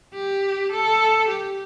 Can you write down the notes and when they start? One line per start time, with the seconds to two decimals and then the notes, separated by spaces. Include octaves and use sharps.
0.15 G4
0.72 A4
1.28 G4